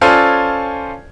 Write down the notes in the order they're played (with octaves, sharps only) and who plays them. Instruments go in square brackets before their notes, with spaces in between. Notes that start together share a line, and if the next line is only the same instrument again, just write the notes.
[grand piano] C#4 F4 A4 C5 D5 G#5